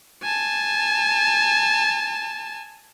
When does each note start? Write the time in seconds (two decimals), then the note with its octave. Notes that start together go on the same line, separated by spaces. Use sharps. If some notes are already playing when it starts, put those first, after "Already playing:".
0.23 G#5 A5